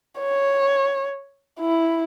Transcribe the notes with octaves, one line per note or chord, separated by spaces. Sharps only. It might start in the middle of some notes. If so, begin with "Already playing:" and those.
C#5
E4